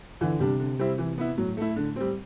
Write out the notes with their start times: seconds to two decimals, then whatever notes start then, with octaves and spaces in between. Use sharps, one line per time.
0.21 D3 E3
0.40 C3 G3 D4
0.59 D3
0.79 G3 C4 E4
0.98 E3
1.18 B3 E4
1.38 A2 F#3
1.57 A3 E4
1.76 D3
1.96 G3 C4